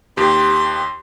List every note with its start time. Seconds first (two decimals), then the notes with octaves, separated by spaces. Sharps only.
0.17 D#2 G4 C6